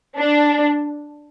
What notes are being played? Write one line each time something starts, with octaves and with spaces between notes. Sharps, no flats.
D4